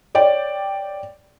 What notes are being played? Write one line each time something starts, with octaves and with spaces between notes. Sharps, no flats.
C#5 D5 G5